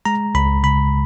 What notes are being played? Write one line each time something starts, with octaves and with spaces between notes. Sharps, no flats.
G#3 A#5
C#2 B5
C#3 B5